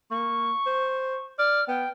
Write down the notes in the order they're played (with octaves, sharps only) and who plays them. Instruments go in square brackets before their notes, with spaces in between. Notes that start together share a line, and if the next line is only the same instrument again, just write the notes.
[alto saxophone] A#3 [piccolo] C#6
[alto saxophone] C5
[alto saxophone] D5 [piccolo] F6
[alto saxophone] B3 [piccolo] G5